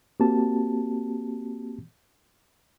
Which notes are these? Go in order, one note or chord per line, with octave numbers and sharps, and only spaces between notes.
A#3 C4 F#4 G4 A5